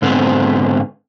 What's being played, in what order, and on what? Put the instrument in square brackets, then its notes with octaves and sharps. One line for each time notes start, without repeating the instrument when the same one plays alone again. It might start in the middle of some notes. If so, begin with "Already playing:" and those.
[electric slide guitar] G#2 D3 B3 C4